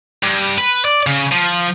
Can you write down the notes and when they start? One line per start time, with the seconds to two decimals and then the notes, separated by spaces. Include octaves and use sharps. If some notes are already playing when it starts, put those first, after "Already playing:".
0.23 G2
0.58 B4
0.85 D5
1.07 C#3
1.32 F3